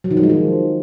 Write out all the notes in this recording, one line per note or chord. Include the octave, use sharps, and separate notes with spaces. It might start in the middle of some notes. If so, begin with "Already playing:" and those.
F#3
D#3
F3
G#3
F3